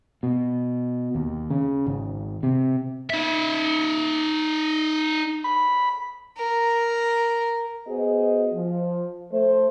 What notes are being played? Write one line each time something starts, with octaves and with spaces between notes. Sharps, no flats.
B2
D#2
C#3
G#1
C3
D#4 E5
B5
A#4
B3 F#4 G#4 C5 D#5
F3
A3 C5